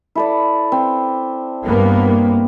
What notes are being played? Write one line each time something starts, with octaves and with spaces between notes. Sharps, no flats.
E4 A4 D5
C4
G2 A#3 B3